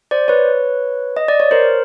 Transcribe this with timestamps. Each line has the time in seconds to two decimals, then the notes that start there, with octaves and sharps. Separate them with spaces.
0.11 C5 D5
0.28 B4 C#5
1.17 D#5
1.28 D5
1.40 C#5
1.51 A#4 C5